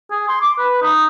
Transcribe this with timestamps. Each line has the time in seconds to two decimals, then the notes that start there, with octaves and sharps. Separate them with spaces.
0.11 G#4
0.29 C6
0.41 D6
0.59 B4
0.82 D#4